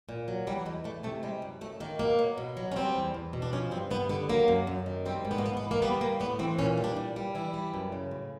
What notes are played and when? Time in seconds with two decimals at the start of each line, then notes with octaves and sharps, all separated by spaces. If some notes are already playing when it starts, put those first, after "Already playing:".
0.09 A#2
0.28 F#3
0.47 E3 G3
0.66 E2 G#3
0.84 E2 A3
1.03 C3 A3
1.23 G3 G#3
1.42 F#2
1.61 F#2 A3
1.80 D#3 A#3
1.99 B2 A#3
2.19 F#3
2.38 B2
2.57 F#3
2.72 C#4
2.76 G3 C4
2.95 E2
3.14 E2
3.33 B2
3.42 D4
3.53 F3 C#4
3.71 G2 C4
3.90 G2 B3
4.09 D3 B3
4.29 F#3 A#3
4.48 F#2
4.67 F#2
4.86 D#3
5.06 G3 C4
5.25 G#2
5.31 B3
5.38 A#3
5.44 G#2 B3
5.57 B3
5.63 E3
5.71 A#3
5.82 G3 B3
6.01 A2 A#3
6.20 A2 B3
6.39 E3 C4
6.58 A#2 C#4
6.77 G3
6.84 D4
6.96 A#2
7.16 G3
7.35 E3 E4
7.54 G3
7.74 F#2
7.92 C#3
8.11 A2